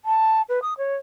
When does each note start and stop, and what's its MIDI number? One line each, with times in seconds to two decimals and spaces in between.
0.05 0.42 81
0.49 0.60 71
0.62 0.74 87
0.78 0.96 73